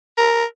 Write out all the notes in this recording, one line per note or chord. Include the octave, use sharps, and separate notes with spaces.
A#4